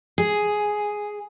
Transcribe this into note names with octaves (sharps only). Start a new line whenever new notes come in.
G#4